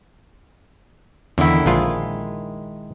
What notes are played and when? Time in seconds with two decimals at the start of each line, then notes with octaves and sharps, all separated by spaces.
1.38 E2 D3 D#3 E4
1.66 A#1 G#3 F4